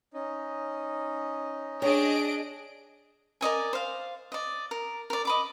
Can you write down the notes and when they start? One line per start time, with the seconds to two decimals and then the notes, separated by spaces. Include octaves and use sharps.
0.14 C#4 D#4
1.82 D4 G4 G#4 C#5 D#5 D7
3.41 A#4 D5 D#5 G#5
3.73 C5 F5
4.32 D5 D#5
4.71 A#4
5.10 A#4 D5
5.25 D#5 B5 D6